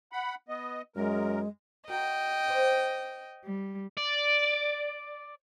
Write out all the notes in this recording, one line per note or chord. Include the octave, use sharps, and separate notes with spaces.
F#5 B5
B3 D#5
F#2 G#3 A#4
F#4 A#4 D#5 G5
C5 D5
G3
D5